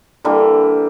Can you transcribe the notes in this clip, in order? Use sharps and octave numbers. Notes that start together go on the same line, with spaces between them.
D3 E3 G3 A#3